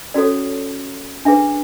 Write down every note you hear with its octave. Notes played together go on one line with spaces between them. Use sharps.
C#4 F#4 A4 C#5 D5
D4 G#4 B4 E5